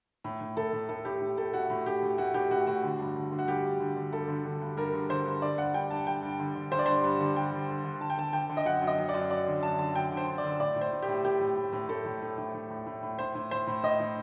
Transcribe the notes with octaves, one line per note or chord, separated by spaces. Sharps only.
A2
A2
A2 A4
A2
A2 A4
A2 G4
A2
A2 A4
A2 F#4
A2
A2 G4
A2
A2 F#4
A2 G4
A2 F#4
A2 F#4
D3
G2
D3
D3
F#4
G2 G4
G2
D3
D3
G2 A4
D3
D3
G2
G2 A#4
D3
D3 C5
G2
D3 D5
G2 F#5
G2 G5
G2 A5
D3 G5
G2
D3
D3
D3 C5
D5
G2 C5
G2
D3
G2 G5
D3
D3
D3
D3 A5
G5
D3 A5
D3 G5
D3
D#5
F#2 F#5
F#2
D#5
F#2
D5
F#2
F#2 D5
D3
F#2 A5
D3 A5
F#2 G5
D3
C5
D3
D5
D3
A2 D5
A2
C5
A2
G4
A2
A2 G4
A2
A2
A2
A2 A4
A2
A2
A2
A2
A2
A2
A2
A2 C5
A2
A2 C5
A2
A2 D#5
A2